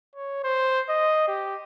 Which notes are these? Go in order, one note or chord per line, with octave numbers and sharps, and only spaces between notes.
C#5
C5
D#5
G4